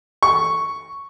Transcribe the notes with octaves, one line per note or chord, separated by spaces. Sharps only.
C#6